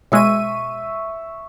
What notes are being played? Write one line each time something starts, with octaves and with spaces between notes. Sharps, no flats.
B2 G#3 E5 C#6 D#7